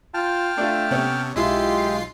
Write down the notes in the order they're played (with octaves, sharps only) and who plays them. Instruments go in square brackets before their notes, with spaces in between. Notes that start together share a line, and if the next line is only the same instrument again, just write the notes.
[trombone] F4 [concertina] G5 A5 F6
[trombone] A3 [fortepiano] D4 F4
[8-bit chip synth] C3 [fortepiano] B3 C#4
[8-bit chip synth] B1 F4 C7 [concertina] G#3 [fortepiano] E4 [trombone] G4